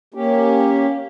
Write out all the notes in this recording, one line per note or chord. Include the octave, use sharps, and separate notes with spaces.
A#3 C#4 G4